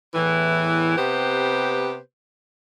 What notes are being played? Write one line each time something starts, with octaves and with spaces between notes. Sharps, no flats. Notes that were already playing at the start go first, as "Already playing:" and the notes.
E2 A2 E3
C3 B3 G4 B4 C5